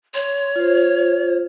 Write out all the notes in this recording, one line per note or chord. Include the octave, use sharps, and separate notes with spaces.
C#5 C6
F4 C5